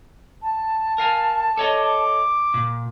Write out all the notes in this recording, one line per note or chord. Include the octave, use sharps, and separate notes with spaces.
A5
A#4 F5 G#5
A4 C#5 D#5 D6
A#2